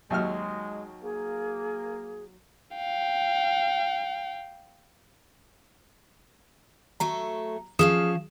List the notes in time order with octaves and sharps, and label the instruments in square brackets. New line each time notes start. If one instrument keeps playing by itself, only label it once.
[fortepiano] D#2 E5 F6 [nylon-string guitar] F#3 D#4 F#4 [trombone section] G#3
[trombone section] A#3 [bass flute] G#4
[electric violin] F5 G5
[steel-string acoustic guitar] F#3 A3 A4 [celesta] A#5
[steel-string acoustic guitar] F3 C#4 F5 [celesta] G#4 D#6 E7